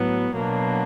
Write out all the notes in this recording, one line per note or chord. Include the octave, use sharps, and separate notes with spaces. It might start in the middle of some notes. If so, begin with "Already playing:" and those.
Already playing: A2 F#3 B3
B2 F#3 A#3 D4